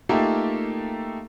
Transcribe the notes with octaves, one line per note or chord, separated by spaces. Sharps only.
A3 A#3 D#4 F4 G4 A4